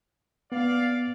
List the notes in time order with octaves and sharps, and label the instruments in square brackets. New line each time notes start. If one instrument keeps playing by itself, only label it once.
[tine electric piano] B3 [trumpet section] D5 F5